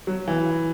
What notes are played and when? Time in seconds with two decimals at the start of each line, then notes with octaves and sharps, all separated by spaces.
0.07 F#3
0.28 E3